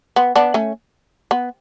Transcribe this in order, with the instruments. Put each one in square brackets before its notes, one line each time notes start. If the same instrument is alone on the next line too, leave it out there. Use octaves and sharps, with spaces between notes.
[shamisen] B3
B3 D4
A3 C#4
B3